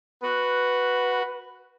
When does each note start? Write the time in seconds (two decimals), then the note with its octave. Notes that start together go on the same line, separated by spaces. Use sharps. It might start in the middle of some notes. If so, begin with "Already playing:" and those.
0.23 F#4 B4